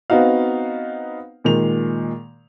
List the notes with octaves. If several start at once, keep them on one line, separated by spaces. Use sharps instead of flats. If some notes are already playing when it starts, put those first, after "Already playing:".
B3 C4 D#4 F#4 F5
A#2 D#3 G#3 F7